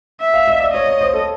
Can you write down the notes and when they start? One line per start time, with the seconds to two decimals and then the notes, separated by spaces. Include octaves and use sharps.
0.21 E5
0.34 F5
0.48 D#5
0.60 D5
0.74 C#5 D#5
0.87 C#5
1.01 C5
1.14 A4